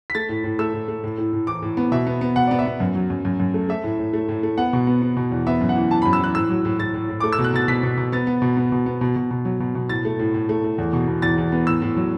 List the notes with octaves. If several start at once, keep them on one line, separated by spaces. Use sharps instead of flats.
B6
A3 A6
A2
A2
A3 E6
A2
A3
A2
A2
A2
E3 D6
A2
B3
B2 E5
B3
B3
B2 F#5
B3 D5
E5
B3
F#2
F#3
F#2
F#2
F#2
A3
A3 E5
A2
A2
A3
A2
A3
B3 F#5
B2
B3
B3
B2
E2
B3 E5
F#2
F#5
E3
E3 A5
F#2 B5
E6
E3 F#6
A2 E6
F#3
A2
A2 A6
A2
A2
A3 D6
E6
B2
F#6
B2 A6
B2 B6
B2
B2
B3 A6
B3
B2
B3
B2
B3
B2
B2
B2
F#3
B2
B2
A2 A6
A3
A2
A2
A3
A3
E2
B2
B2
E2 A6
E2
B3
A2 E6
A2
F#3